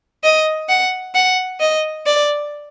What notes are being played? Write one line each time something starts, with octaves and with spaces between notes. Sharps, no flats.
D#5
F#5
F#5
D#5
D5